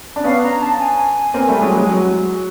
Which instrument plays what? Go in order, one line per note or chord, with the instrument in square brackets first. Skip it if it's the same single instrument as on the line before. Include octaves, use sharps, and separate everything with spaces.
[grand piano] D4
[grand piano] B3 C#4 [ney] F5
[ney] A#5
A5
G#5
[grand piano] A#3 C4
G3 A3
F#3 G#3
F#3 G#3
F#3